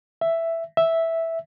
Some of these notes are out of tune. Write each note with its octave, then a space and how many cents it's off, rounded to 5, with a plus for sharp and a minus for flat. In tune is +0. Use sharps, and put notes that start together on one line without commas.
E5 +5
E5 -5